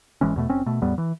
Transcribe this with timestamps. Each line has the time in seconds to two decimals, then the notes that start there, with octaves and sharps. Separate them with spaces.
0.21 G#1 E3 G#3 C#4
0.36 E2 B2 A3
0.49 F#1 C4 C#4
0.66 B2 A3
0.82 E2 A2 G3 B3
0.98 E3